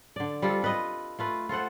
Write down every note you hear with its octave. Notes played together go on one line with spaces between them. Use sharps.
D3 D5
G3 C4 F4 A4
A4 B4 D#5
A3 F4 B4
F4 A4 C5 F#5